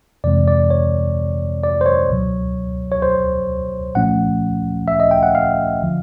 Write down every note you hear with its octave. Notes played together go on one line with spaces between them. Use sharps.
F2 C3 E3 G#3 C4 D5
D5
C#5
D5
C5
C#5
C#2 B2 F#3
C#5
C5
C2 A#2 F3 A3 C#4 F#5
E5
D#5
G5
F#5
F5
D3 F3